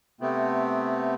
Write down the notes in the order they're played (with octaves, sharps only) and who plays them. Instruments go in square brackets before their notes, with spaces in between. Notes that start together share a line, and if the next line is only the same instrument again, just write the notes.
[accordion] C3 A3 B3 C4